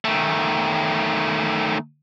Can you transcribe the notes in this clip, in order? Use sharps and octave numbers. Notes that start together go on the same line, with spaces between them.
D#3 A3